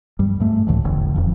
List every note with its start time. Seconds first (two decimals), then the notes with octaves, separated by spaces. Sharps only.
0.19 G2 G3
0.40 G#2 A3
0.67 C#2 A2 D3 E3
0.84 D1 A1 E2 D3
1.14 D#1 F2 F3